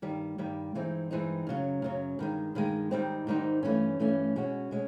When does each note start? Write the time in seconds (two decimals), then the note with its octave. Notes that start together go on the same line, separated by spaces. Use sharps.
0.02 G2 D#3 G3
0.38 G2 D#3 G3
0.75 G2 E3 G#3 C4 D#4
1.11 G2 E3 G#3 C4 D#4
1.47 F#2 C#3 F#3
1.82 F#2 C#3 F#3
2.19 G2 D#3 G#3
2.55 G2 D#3 G#3
2.91 G#2 D#3 G3 C4 D#4
3.27 G#2 D#3 G3 C4 D#4
3.63 G2 E3 A3 C#4
4.00 G2 E3 A3 C#4
4.36 B2 G#3 C#4 F#4
4.71 B2 G#3 C#4